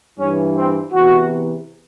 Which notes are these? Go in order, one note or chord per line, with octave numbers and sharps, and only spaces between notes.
G2 E3 C#4
C4
E2 C3 E3 F#4